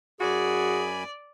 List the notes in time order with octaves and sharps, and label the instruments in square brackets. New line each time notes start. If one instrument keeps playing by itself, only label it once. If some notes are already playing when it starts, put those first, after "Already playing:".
[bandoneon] F#2 G#5 B5 [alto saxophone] F#4 [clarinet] G#4 [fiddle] D5